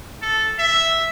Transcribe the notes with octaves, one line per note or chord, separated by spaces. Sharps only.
A4
E5